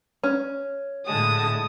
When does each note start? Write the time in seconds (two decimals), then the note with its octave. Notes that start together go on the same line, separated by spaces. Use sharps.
0.23 C#4
1.06 A2 D3 G#3 A5 D#6